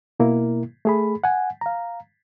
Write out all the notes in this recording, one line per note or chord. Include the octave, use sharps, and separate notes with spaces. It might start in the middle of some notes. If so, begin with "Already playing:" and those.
B2 A#3 E4 A#4
A3 G#4 B5
F#5 G#5
F5 A#5